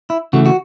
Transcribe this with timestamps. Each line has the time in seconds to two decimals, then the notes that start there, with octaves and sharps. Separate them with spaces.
0.10 E4
0.33 C#3 E3 A3 F#4
0.46 F#4